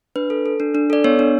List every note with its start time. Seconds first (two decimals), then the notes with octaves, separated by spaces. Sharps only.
0.16 D4 B4
0.30 A4
0.46 A4
0.60 D4
0.75 D4
0.90 A4 D5
1.04 B3 C#5
1.19 D4